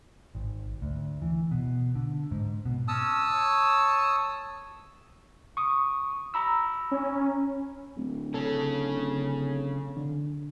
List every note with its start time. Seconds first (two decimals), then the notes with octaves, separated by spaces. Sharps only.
0.35 G#1
0.82 D2
1.22 E3
1.51 B2
1.95 D3
2.31 G#2
2.65 B2
2.88 C#4 A5 D#6 E6
3.33 C#5
5.57 C#6 D#6
6.34 A#5 B5 E6
6.91 C#4
7.96 D1
8.34 C#3 C#4 A4
9.97 D3